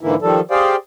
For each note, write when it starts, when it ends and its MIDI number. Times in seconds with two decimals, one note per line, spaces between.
0.01 0.15 44
0.01 0.15 50
0.01 0.15 52
0.01 0.15 58
0.01 0.15 64
0.22 0.40 51
0.22 0.40 53
0.22 0.40 55
0.22 0.40 69
0.51 0.76 67
0.51 0.76 68
0.51 0.76 72
0.51 0.76 74
0.51 0.76 77
0.51 0.76 79